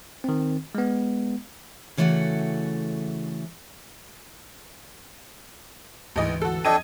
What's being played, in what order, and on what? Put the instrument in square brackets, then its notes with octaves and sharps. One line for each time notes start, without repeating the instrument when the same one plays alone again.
[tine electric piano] D#3 C4
G#3 B3
[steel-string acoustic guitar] C#3 E3 A3 F#4 A4 F#5
[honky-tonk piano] A1 D#5 [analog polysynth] D2 G#2 E3
[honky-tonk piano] F#4 A4
[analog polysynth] F2 [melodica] D4 A4 G5 [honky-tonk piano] D#5 G#6 D#7